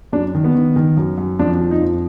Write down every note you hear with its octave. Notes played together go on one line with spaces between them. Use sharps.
F#2 D4
D#3
B3
D#3
D#3
F#2
F#2
F2 D4
F3
D#4
F2